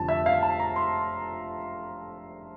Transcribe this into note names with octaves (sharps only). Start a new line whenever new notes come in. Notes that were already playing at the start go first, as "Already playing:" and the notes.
Already playing: F1 F2 D3 A5
E5
F5
A5
A#5
C6